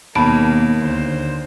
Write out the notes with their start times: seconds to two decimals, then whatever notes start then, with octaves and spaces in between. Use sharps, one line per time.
0.15 D#2 B2 A#3 A5 B5 D7
0.82 D2 C5